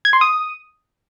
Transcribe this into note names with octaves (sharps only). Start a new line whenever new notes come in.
G#6
C6
D#6